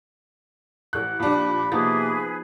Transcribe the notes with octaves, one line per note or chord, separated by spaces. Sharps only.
A1 F#6
A#2 F3 G3 D4 B5
C3 F3 A#3 B3 D#4 G#4 B4 A6